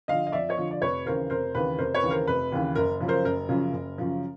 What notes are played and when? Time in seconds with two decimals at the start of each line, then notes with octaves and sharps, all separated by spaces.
0.08 D3 F3 D#5 F5
0.27 D#5
0.32 F2 D5 E5
0.49 C#5 D#5
0.58 D3 F3
0.71 D5
0.81 F1 B4 C#5
1.05 D#2 C#3 E3 A#4 C5
1.30 F1 A#4 C5
1.55 D#2 C#3 E3 B4
1.78 F1 A#4 C5
1.94 B4 C#5
2.03 D#2 C#3 E3
2.11 A#4 C5
2.27 F1 B4
2.52 D#2 C#3 E3
2.75 F#1 A#4
3.00 F#2 C#3 F3
3.08 A#4 C5
3.24 F#1 A#4
3.49 F#2 C#3 F3
3.73 F#1
3.98 F#2 C#3 F3